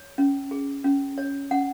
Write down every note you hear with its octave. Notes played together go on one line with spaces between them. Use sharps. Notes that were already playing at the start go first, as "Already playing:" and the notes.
Already playing: C#5
C#4
G#4
C#4
C#5
C#4 F#5